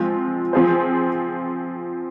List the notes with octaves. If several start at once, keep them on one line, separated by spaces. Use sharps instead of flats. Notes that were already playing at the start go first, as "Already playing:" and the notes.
Already playing: F3 G#3 C4 F4
F3 C4 F4 G#4 C5